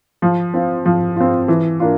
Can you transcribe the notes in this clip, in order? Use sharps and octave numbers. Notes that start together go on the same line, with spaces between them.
F3
C4 F4
F3
C4 F4
E3
A#3 D4 F4